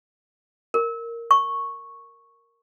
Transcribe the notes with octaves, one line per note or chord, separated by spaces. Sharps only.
A#4
C#6